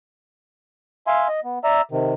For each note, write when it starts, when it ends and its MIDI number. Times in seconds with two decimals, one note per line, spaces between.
1.07 1.28 76
1.07 1.28 77
1.07 1.28 80
1.07 1.28 84
1.28 1.40 75
1.44 1.59 59
1.64 1.81 74
1.64 1.81 76
1.64 1.81 82
1.64 1.81 88
1.92 2.14 48
1.92 2.14 51